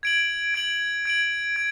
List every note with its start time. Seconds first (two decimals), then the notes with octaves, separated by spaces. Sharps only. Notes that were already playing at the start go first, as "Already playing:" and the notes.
0.03 G#6 D7 F#7
0.54 G#6 D7 F#7
1.05 G#6 D7 F#7
1.56 G#6